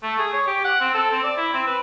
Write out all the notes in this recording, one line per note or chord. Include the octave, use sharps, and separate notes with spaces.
A3
G#4
C#5
G4
F#5
C4
A4
C4
D5
E4
C4
B4